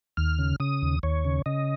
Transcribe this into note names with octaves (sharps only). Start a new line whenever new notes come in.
D#2 F6
C#3
C#3 D#6
D#2
D#2 C#5
C#3
C#3 D#5